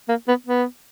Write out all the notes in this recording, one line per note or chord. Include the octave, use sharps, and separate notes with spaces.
A#3
B3
B3